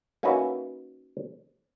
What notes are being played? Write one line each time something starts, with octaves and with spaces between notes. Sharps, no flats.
A#3 C#4 D#4 F#4 B4 E5